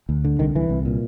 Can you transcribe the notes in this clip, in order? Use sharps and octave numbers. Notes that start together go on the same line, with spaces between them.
D2
D3
C2 D#3
C2 E3
C2
A#2